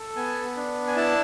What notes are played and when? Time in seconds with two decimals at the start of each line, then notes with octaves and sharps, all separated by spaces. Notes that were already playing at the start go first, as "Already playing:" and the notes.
Already playing: A4
0.16 B3 G#5
0.57 D4
0.87 G#5
0.96 E4 A5